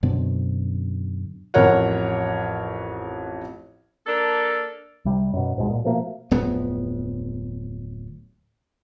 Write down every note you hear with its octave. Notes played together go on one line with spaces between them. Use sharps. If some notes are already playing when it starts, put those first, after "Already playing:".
F#2 B2 D3 C4
A1 F2 A#4 C#5 F#5
A#3 D4 A4 A#4
C2 C3 G3
F#2 B2
C#2 G#2 B2 G#3
A#2
B2 F3 A3 A#3
D1 F2 B3